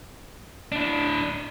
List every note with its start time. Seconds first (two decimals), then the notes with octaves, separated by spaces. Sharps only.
0.72 D4 E4